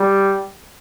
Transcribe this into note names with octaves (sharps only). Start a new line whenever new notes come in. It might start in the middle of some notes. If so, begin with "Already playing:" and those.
Already playing: G3